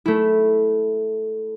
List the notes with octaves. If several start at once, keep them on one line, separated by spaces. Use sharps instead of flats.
A3 E4